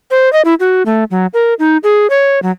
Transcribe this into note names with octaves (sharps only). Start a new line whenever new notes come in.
C5
D#5
E4
F#4
A3
F#3
A#4
D#4
G#4
C#5
F#3